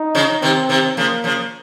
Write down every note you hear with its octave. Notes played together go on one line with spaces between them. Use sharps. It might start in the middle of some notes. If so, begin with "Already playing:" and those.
Already playing: D#4
C#3 F3
C3 D#3 C4
C3 D#3
C#3 F3 A#3
C#3 F3